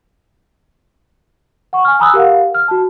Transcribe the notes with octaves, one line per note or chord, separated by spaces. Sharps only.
F#5 C#6
G#5 F6
G#5 A#5 B5 D#6 E6 F#6
G4 A#4 F5 F#5
F6
F#4 A5